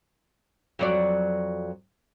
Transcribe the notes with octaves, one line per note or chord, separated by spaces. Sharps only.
F2 F#3 D5